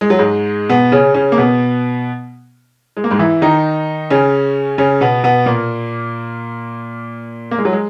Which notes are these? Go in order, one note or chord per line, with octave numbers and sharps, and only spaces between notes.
G#3
F#3
G#2 G#3
B2 B3
C#3 C#4
C#3 C#4
A#3
B2 B3
G#3
A#3
G#2 G#3
E3 E4
D#3 D#4
C#3 C#4
C#3 C#4
B2 B3
B2 B3
A#2 A#3
A#3
G#3
F#3
G#3